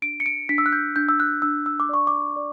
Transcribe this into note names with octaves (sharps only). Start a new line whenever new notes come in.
D4 D7
C#7
D7
D4 B6
E6
F#6
G6
D4 G6
E6
F#6
D4 E6
E6
D6
D5 C#6
D6
D5